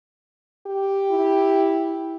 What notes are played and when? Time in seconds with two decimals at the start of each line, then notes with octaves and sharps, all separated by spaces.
0.67 G4
1.11 E4